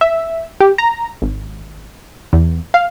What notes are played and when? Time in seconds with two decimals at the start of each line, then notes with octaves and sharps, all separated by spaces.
0.01 E5
0.60 G4
0.78 A#5
1.22 G#1
2.33 E2
2.74 F5